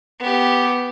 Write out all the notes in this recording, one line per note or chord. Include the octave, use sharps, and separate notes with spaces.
B3 G4